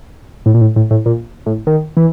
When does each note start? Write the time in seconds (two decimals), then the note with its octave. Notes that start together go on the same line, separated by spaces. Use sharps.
0.46 A2
0.54 A#2
0.61 A2
0.76 A2
0.91 A2
1.06 A#2
1.46 A2
1.67 D#3
1.97 E3